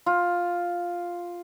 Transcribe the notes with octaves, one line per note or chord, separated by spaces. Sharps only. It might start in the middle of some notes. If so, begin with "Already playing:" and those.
F4